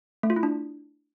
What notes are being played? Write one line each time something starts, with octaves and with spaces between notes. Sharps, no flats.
A3
F4
E4
D4